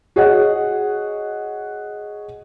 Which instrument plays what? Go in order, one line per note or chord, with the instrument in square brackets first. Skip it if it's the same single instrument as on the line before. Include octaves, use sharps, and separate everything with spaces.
[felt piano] F#4 G#4 C#5 D#5 F#5